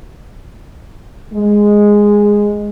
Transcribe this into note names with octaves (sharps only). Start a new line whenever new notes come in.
G#3